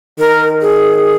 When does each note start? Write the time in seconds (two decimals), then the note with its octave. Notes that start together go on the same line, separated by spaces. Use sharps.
0.19 D#3 A#4
0.61 G#4